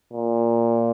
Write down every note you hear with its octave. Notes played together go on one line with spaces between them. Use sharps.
A#2